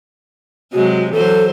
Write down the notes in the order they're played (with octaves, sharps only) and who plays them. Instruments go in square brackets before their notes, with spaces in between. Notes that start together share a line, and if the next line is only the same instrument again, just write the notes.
[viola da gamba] C3 F#3 G#3 [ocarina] F#4
[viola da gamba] E3 F#3 C5 [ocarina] A4